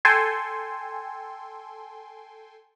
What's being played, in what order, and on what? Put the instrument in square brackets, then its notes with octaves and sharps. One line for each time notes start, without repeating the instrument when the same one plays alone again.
[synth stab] A4 G5 G#5 C6